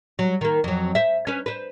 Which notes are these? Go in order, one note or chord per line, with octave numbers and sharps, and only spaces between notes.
F#3
D#3 A#3
F2 F#3
C5 E5
C#4 B4
B4 C5